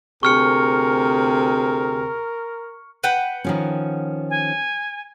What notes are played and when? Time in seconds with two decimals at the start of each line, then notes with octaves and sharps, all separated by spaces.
0.23 D2 C3 G#4 A#4 C#6 F6 C#7
3.04 B4 F#5 G5
3.44 D#3 F3 C#4
4.30 G#5